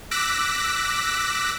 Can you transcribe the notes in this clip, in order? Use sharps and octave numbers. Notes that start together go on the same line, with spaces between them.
D6 E6 F#6 A#6 B6